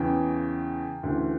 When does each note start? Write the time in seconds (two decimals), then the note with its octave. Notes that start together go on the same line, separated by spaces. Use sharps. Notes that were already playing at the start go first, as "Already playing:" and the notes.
Already playing: E2 C#3 E3 G5
1.03 D2 C#3 E3